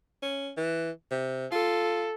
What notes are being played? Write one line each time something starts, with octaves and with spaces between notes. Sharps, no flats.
C#4
E3
C3
F4 A4